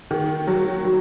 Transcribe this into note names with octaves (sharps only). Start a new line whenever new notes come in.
D#3
F#3
F#3